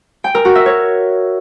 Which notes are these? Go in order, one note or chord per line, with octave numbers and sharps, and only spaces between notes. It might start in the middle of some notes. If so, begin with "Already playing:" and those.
G5
A#4
F#4
E5
C#5